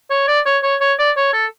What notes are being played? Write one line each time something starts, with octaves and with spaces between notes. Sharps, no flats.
C#5
D5
C#5
C#5
C#5
D5
C#5
A4